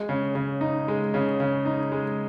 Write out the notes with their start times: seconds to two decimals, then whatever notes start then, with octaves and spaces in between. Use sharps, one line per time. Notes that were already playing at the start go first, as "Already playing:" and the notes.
Already playing: G#3
0.09 C#3
0.35 C#3
0.61 D#4
0.88 G#3
1.14 C#3
1.40 C#3
1.65 D#4
1.92 G#3